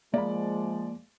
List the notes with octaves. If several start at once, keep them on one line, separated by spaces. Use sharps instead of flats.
F3 G#3 A#3 D5 B5